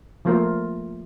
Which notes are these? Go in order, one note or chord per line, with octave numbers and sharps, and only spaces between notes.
F3 A3 A#3 F4 A#4 C5